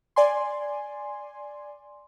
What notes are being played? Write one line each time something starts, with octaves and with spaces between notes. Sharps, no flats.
D5 G#5 C6